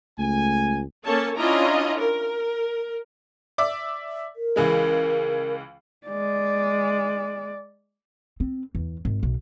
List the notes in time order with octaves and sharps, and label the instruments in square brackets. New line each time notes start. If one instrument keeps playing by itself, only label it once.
[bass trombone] C#2 [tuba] A3 [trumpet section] G#5
[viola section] A#3 C#4 A4 C#5 A5
C#4 D4 E4 F4 D#5 A#5
A#4
[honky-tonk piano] D5 E5 D6
[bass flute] A#4
[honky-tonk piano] C#2 E3 G#3
[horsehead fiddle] G#3 D5
[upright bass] C4
E2
G#1
B1